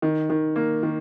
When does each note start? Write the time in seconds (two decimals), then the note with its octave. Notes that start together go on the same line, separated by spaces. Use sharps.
0.02 D#3
0.30 D#3
0.56 A#3
0.83 D#3